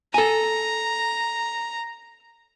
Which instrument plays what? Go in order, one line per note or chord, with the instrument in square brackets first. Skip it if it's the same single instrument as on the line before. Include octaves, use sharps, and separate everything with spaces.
[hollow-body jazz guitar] A4 G#5 [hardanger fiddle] A#5